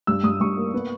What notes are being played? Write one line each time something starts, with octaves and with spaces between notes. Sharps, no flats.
G2 E6
G2 D#6
G2 C#6
A#3
B3